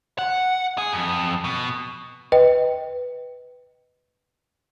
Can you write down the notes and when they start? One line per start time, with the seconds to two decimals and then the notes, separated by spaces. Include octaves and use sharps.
0.18 F#5
0.78 G#4
0.93 F2
1.44 B2
2.32 B4 D#5 G5